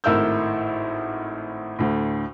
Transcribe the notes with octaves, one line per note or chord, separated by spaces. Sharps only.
G#1 A2 E4 A#4 E6 G6
D2 A2